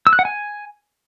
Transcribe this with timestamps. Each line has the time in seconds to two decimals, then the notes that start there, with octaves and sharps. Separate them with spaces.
0.07 E6
0.13 F#6
0.19 F#5
0.25 G#5